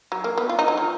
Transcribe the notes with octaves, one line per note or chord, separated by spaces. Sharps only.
F#3
A#3
B3
F4
D#4
F#3
F3